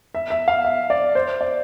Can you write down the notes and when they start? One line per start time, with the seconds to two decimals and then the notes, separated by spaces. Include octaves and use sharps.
0.15 E5
0.30 E5
0.48 F5
0.65 E5
0.90 D5
1.15 C5
1.41 D5